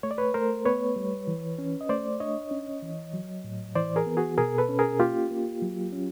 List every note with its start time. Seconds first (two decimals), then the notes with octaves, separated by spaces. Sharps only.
0.03 A3 C#5
0.11 D5
0.18 B4 C#5
0.34 A3 A#4 C5
0.65 B3 B4 C#5
0.96 G3
1.27 E3
1.59 C#4
1.81 D#5
1.89 A3 C5 D5
2.20 D4 C#5 D#5
2.51 C#4
2.83 E3
3.13 F#3
3.44 A2
3.76 E3 C5 D5
3.96 G#4 A#4
4.07 B3
4.17 F#4 G#4
4.38 B2 G#4 A#4
4.58 A4 B4
4.69 C#4
4.79 G#4 A#4
5.00 A#3 F4 G4
5.31 A#3
5.62 F#3
5.92 C#4